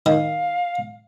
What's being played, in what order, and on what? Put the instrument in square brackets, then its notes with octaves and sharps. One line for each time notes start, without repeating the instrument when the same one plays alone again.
[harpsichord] D#3 [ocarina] F5